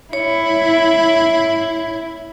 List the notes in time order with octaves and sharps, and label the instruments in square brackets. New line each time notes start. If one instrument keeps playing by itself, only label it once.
[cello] E4 [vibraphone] C#5